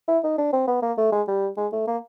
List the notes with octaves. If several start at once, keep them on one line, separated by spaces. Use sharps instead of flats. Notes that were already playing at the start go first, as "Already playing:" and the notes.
E4
D#4
D4
C4
B3
A#3
A3
G#3
G3
G#3
A3
A#3